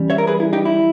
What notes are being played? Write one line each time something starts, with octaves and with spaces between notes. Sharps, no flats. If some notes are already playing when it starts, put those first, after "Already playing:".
Already playing: E3 G3 C#4
C#5 E5
A#4
G#4 B4
E4
D#4 G4
E4